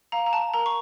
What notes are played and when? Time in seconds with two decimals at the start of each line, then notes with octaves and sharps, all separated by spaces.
0.12 F5 A#5
0.26 A#5
0.33 A5
0.54 A#4 A#5
0.66 C#6